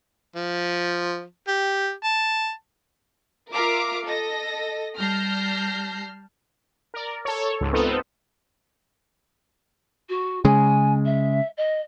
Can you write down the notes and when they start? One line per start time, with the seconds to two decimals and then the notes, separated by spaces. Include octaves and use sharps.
0.36 F3
1.48 G4
2.04 A5
3.52 F4 A#4 E5 F5 A#5 D6
4.05 A4 D#5 A#6
4.97 G3 A5 F6 G6 A#6 C7
6.94 A#4 D5
7.25 A4 C#5
7.61 C#2 G#2
7.73 B3 C4 D#4 F4 A4
10.09 F#4
10.45 C#3 G#3 G#5
11.05 E5
11.57 D#5